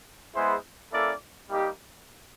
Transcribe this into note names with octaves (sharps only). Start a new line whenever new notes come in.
G#3 B3 E4 G#4 C5
A#3 C#4 E4 A4 D5
G3 A#3 D#4 G4